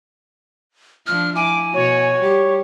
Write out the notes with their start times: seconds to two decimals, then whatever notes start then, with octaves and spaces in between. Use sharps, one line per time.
1.07 F3 D4 F6
1.35 F3 E4 G#5 D6
1.74 B2 F#4 C#5
2.22 G3 G4